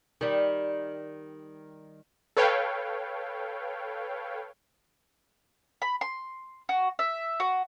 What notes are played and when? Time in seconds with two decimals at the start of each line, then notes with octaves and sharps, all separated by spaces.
0.21 D#3 G3
2.37 A4 B4 C#5 F5 G5
5.82 B5
6.01 C6
6.69 F#4
6.99 E5
7.40 F#4